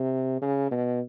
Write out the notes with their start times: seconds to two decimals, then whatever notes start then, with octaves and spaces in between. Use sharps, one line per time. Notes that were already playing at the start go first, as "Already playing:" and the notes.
Already playing: C3
0.42 C#3
0.71 B2